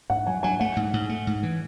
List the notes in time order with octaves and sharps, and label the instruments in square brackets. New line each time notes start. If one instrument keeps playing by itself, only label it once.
[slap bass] G#2 [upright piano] F#5
[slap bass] F#3 [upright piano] G#5
[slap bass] F#3 [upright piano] G#5
[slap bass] A3 [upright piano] F#5
[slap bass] G#2
G#2
A3
G#2
E3